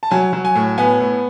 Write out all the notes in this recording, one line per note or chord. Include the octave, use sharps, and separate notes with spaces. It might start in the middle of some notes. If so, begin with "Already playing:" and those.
A5
F#3 G#5
F#3
G#5
A2
B3 G#5
A2